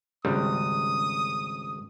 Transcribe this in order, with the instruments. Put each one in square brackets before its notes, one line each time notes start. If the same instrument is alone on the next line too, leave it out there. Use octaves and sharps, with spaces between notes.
[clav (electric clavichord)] G#1 C#2 G3 [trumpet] D#6